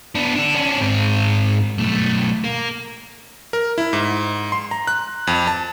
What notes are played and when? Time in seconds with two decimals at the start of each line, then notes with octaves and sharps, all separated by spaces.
0.15 B3 D4
0.35 D3 D4
0.55 C#4 D4
0.81 G#2 C4
1.78 B1 A3
2.44 A#3
3.53 A#4
3.78 E4
3.93 G#2
4.52 C6
4.71 A#5
4.87 F#6
5.27 F2
5.47 A5